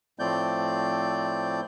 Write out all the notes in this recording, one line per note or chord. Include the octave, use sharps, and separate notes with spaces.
A2 F3 A3 C4 D5 G6